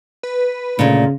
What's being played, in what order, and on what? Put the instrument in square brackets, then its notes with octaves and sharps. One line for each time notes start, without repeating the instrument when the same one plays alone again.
[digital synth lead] B4
[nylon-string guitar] D2 A#2 [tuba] C#3